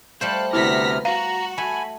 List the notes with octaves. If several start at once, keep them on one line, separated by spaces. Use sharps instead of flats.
G3 A3 A4 C5 F5 F#6
D2 C3 B3 E4 F6 A#6 B6
F#4 F5 A#5
A3 G#5 B5